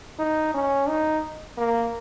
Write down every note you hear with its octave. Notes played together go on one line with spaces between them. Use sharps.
D#4
C#4
D#4
A#3